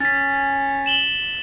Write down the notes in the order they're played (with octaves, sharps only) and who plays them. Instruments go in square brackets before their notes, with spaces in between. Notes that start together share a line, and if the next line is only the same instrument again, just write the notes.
[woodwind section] C#4 [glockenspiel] A6 B6
[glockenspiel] E7 F#7 G7